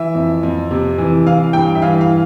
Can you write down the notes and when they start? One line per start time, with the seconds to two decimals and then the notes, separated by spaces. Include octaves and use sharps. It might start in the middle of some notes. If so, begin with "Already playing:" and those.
Already playing: E3 E5
0.15 F2
0.43 F2
0.71 C3
0.98 E3
1.26 E3 F5
1.53 G2 G5
1.75 E5
1.82 E3 F5
2.01 F5